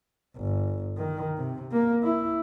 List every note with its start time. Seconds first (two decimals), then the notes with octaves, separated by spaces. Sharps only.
0.37 G1
0.97 D#3
1.37 C3
1.72 A#3
2.03 E4